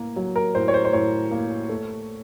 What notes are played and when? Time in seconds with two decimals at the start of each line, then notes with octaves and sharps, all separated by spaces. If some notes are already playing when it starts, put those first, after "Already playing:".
Already playing: A2 A#3 A#4
0.16 F#3
0.36 A#4
0.55 A2 C5
0.68 C#5
0.74 C5
0.85 C5
0.93 A2 C#5
1.31 A#3
1.69 A3